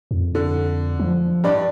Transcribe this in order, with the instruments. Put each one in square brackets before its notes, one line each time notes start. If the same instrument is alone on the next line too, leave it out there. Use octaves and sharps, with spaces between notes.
[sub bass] F2
[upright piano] D3
[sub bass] F3
[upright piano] G2 D5